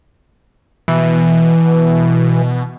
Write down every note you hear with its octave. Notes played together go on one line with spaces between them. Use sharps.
B2 E3